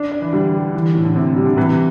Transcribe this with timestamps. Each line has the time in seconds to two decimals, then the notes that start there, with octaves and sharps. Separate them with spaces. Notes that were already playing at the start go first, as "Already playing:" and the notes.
Already playing: D4
0.12 D5
0.22 E3
0.33 D3 G3
0.54 G4
0.75 E3
0.95 A2
1.05 D3
1.15 A2 C3
1.36 G3
1.46 D3
1.57 C3 E3